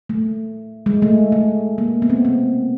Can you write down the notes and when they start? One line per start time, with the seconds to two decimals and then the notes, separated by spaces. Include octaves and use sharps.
0.09 A3
0.86 G#3
1.02 A3
1.32 A3
1.78 A#3
2.02 B3
2.10 C4
2.25 C4